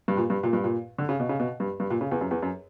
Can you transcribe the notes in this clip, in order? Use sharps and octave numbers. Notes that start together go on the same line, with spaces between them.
G2
A#2
G2
A#2
G2
A#2
D3
C#3
B2
C#3
B2
G2
G2
A#2
C#3
E2
F#2
E2
F#2